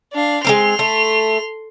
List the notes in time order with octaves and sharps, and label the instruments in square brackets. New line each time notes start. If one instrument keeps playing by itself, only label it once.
[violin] D4 F5
[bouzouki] G#3 A#3 C4 [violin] C6 F7
[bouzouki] A3